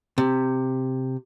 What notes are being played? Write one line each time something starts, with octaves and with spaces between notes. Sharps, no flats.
C3